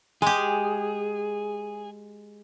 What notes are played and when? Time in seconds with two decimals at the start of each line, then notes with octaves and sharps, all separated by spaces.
0.22 G#3 G4 G#4